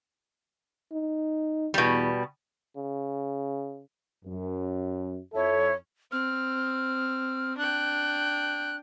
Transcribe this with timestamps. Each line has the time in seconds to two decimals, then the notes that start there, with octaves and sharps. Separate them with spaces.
0.92 D#4
1.74 E2 B2 G3
2.77 C#3
4.25 F#2
5.34 F2 E4 A4 C#5 E5
6.12 C4 F6
7.58 D4 G5 F#6